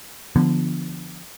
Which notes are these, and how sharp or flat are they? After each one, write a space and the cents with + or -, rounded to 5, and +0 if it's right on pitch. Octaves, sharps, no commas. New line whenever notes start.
D3 +0 F3 -20 B3 -5